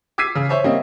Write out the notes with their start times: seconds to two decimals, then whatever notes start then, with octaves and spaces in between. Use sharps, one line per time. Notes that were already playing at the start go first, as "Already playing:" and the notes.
0.18 D6 E6 G#6 B6 C7 D#7
0.35 C#3
0.49 C5 C#5 E5
0.64 G3 A#3 C4 D#5